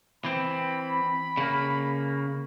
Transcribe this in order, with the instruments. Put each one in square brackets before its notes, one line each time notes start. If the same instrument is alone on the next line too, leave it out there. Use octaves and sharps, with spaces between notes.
[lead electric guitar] E3 C4 [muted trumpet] B5
[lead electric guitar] C#3 A#3